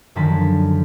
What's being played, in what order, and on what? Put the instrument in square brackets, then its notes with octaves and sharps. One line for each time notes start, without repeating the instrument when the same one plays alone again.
[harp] F#2 D3 D#3 F3 A5 B6